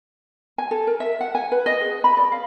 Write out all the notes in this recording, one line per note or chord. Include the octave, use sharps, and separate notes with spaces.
G#5
A4
A#4
E5
F#5
G#5
B4
D#5
G#4
B5
D5
F5